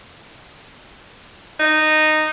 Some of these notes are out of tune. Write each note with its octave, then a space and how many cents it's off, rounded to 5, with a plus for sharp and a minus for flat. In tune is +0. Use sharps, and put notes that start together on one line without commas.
D#4 -10